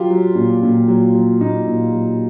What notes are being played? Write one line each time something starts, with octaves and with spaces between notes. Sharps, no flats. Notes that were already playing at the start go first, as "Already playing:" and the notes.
Already playing: F#3 F4 G4
F#3
A#2
A#2
F#3
F#3
A#2 D#4
A#2
F#3